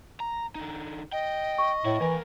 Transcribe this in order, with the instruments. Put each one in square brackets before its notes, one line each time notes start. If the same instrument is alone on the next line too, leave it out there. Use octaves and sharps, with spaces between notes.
[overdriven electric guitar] A#5
D3 D#4
[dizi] D#5 [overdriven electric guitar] G5
[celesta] C#6
[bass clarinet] A2 [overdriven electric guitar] E4 C#5
[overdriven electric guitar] D#2 A#4 [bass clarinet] E3